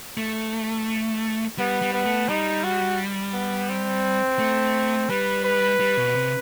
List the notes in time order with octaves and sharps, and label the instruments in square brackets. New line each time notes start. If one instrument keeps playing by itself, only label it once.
[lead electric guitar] A3
[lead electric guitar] G3 [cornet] B3
[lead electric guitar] G3
[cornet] B3
[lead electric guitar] A3
[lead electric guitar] G3 [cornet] D#4
[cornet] F#4
B3
C4
[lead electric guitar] A3
[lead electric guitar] G3 [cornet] B4
[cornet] B4
[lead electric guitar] G3
B2
C3